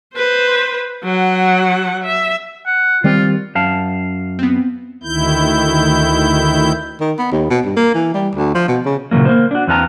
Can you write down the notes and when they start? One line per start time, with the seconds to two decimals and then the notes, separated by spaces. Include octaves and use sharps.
0.15 B4 C5
1.04 F#3 F#5
2.04 E5
2.66 F#5
3.04 D#3 G3 C4 F4
3.55 F#2 F5 A5
4.39 B3 C4
5.03 D2 D#3 E4 G6
7.01 D#3
7.19 B3
7.32 D#2
7.50 B2
7.65 G2
7.77 A#3
7.94 E3
8.14 G3
8.35 D2
8.55 F3
8.68 B2
8.85 C#3
9.11 A#2 C#3 E3 F#3 A#3
9.25 A#3 C5
9.51 D4 F#4
9.67 E2 C4 B4 F5 A5 A#5